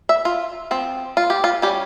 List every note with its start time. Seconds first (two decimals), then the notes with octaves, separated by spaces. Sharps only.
0.09 E5
0.25 F4
0.71 F3 C4
1.17 F4
1.30 G4
1.44 F4
1.62 G3 C#4 G4